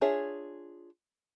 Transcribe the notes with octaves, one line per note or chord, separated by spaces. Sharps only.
D4 F4 G#4 C#5 E5